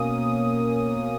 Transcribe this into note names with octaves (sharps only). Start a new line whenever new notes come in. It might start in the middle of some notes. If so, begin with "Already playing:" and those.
Already playing: B2 A#3 C#4 D#6